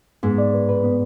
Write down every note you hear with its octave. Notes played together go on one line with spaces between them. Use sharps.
G#2 B3
D5
B4
B4
B3